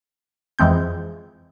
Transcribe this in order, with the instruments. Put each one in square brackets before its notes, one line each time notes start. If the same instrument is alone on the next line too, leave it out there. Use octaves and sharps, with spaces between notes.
[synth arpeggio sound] F2 E3 G#3 C4 G6